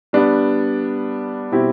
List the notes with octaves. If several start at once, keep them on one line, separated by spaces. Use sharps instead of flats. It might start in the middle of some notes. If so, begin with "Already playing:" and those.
G3 B3 D4
B2 G3 C4 E4 G4